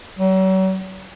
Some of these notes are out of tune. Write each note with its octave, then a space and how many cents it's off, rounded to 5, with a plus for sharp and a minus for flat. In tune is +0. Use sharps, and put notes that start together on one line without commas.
F#3 +40